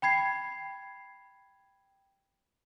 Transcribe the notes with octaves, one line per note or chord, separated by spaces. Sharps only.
G5 B5 G#6 C7